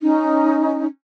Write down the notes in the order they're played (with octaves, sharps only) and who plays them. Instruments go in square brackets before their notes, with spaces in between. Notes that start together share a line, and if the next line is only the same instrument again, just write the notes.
[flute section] C#4 D#4